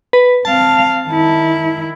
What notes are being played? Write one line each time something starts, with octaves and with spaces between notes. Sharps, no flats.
B4
C4 F5 A5
D#3 E4